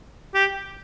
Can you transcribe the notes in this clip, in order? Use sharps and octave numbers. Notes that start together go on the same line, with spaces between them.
G4